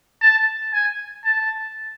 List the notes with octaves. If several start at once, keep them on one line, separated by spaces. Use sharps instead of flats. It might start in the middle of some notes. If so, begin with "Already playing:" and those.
A5
G#5
A5